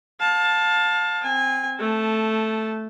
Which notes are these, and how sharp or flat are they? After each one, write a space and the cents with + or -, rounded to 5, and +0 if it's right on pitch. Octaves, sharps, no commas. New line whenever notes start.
F5 +30 A5 +0
C4 +0 G#5 -25
A3 +0 A5 -15